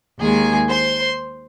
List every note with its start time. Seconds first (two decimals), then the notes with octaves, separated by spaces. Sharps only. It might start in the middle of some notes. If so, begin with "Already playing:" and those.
0.20 D#2 D#3 G#3 G#4 G#5
0.69 C5 C6